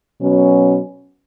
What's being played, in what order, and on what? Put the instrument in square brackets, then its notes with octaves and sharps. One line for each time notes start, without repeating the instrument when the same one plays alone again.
[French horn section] B2 F#3 C#4